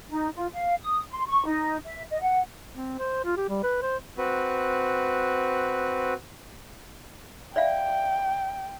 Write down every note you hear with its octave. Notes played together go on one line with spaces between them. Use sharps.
D#4
F4
F5
D#6
C6
C#6
D#4
E5
D#5
F#5
C4
C5
F4
G4
G3
B4
C5
C4 F#4 B4
D5 E5 F5 G5